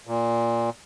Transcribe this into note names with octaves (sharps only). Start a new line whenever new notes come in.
A#2